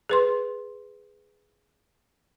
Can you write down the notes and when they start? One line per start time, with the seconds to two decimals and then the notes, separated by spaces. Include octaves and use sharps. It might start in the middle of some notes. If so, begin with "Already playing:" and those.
0.09 G#4 B4 C6